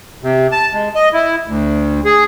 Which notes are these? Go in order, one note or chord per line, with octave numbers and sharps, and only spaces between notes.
C3
A5
G#3
D#5
E4
D2
G#4